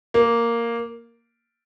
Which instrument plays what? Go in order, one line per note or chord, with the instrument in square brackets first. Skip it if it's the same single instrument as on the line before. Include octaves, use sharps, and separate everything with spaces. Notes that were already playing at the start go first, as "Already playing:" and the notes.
[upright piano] A#3